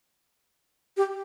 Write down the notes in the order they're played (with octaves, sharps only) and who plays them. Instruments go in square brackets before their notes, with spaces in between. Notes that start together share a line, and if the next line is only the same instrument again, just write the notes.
[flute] G4